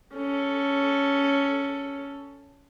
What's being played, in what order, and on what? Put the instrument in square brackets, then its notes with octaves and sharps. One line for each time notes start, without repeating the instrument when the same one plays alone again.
[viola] C#4 A4